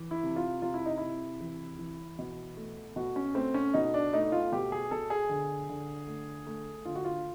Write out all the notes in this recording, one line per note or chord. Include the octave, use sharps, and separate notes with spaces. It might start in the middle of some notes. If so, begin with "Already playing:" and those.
Already playing: E3
E4
C3
F4
C3 F4
E4
D#4
C3 E4
E3
E3
B2
A3
B2 F#4
C#4
A3 C4
C#4
B2 D#4
D4
A3 D#4
F4
B2 G4
G#4
B2 A4
G#4
D3
D3
A3
A3
D3 F4
F#4
F4